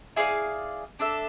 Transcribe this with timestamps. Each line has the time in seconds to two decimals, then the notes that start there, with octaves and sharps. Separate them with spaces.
0.16 E4 G#4 D5 F5
0.99 D4 A4 E5